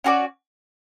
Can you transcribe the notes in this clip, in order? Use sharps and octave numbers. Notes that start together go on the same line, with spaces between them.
C#4 F#4 A4 D5